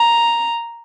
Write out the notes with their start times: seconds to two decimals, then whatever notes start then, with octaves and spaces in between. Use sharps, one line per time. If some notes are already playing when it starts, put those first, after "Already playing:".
Already playing: A#5